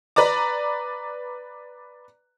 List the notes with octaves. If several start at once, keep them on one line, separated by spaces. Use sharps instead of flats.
B4 D5 A#5 D6